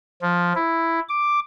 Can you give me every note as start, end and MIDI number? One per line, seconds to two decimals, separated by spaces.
0.22 0.53 53
0.55 0.99 64
1.09 1.40 86